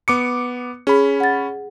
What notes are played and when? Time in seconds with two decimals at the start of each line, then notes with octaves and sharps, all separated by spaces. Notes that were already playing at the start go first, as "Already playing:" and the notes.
0.08 B3 D6 C#7
0.87 C#4 G#4 B5
1.20 F#5 A6